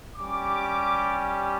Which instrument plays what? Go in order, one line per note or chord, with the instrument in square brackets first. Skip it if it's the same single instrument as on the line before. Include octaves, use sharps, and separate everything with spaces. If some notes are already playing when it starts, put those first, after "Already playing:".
[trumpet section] G3 C#4 G4 D6